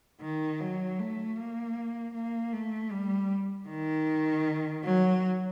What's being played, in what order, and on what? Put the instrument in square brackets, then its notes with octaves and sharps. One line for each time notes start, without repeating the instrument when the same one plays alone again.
[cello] D#3
F#3
A3
A#3
A#3
A3
G3
D#3
F#3